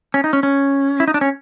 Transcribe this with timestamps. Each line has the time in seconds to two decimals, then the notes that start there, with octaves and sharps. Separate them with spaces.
0.14 C#4
0.24 D#4
0.33 C#4
0.43 C#4
1.00 E4
1.08 D#4
1.14 D4
1.21 C#4